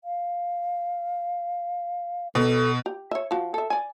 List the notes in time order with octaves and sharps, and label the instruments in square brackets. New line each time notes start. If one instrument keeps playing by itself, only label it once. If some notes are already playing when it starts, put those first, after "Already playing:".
[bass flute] F5
[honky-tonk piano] B2 [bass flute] A4
[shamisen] G4
C#5 E5
F3 F#4
A4 E5
D5 G#5